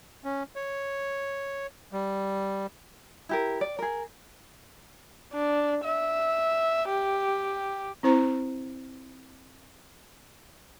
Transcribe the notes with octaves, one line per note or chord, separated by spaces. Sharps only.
C#4
C#5
G3
E4 G4 A#4
D5
G#4 A#4
D4
E5
G4
C4 E4 C5 A#5